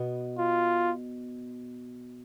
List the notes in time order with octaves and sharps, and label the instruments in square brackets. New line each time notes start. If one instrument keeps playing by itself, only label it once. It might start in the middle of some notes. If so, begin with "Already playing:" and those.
Already playing: [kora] B2 B3
[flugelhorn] F4